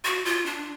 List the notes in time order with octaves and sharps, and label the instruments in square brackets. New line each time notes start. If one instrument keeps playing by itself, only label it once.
[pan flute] F#4
F4
D4